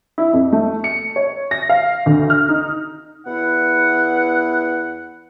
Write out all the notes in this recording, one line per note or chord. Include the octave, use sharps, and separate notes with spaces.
E4
F2
A3
C#7
C#5
A#6
F5
D2
F6
D#4
E2 B3 E4 F#5